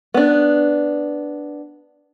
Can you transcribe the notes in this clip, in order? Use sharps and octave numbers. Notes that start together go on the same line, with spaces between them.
B3 D4